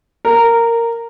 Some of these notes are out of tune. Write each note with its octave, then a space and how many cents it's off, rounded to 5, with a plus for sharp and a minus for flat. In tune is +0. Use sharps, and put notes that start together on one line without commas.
A#4 -10